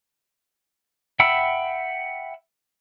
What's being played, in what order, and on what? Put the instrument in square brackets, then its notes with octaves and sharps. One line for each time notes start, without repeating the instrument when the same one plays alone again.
[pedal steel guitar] E5 F#5 G5 B5 E6